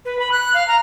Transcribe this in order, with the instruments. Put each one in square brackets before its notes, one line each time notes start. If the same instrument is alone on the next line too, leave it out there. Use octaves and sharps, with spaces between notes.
[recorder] B4
B5
F#6
F5
A#5